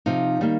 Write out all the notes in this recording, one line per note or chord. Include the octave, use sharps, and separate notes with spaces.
C3 F3 D#4 F5
D#3 G3 A#3